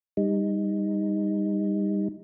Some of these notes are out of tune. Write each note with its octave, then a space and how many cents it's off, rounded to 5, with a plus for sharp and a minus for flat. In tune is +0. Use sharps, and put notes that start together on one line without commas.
G3 +25 D#4 +0